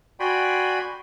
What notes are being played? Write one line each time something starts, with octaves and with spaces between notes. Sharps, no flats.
F#4 D5 G5 G#5 B5 C6